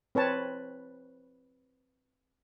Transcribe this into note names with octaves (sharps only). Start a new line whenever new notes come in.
C4 B4 C#5 A5